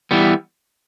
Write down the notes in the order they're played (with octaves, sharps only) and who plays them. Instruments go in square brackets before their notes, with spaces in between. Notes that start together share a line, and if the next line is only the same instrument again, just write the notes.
[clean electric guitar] E3 G3 B3